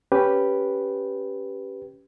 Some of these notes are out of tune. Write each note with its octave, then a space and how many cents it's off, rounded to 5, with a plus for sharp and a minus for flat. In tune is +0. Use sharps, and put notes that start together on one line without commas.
C#4 +0 G4 +0 B4 +0